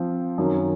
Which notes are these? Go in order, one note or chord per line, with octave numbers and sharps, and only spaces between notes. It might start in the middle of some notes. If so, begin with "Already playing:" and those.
Already playing: F3 C4 F4
F#2 D#3 F#3